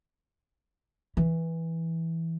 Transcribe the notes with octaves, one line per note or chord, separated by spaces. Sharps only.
E3